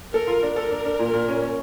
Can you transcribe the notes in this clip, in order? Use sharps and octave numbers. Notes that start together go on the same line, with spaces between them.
A4 A#4
F4
D4
A4 A#4
D4
D4
A#2
A#2
C#4
C#4